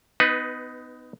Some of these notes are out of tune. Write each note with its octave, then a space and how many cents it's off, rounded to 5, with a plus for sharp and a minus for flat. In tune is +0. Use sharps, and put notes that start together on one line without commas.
B3 +25 D#4 +0 B4 +0